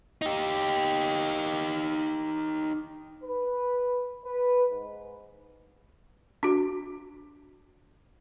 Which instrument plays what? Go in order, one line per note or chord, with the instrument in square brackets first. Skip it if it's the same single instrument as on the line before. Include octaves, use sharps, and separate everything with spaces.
[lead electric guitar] D#4 G4
[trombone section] B4
B4
G#2
[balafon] D4 F#4